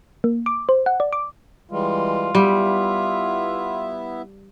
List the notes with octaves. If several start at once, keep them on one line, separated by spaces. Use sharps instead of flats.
A#3
D6
C5
F#5
D5
D6
E3 G3 G#3 F4
G3 B3 E4 E5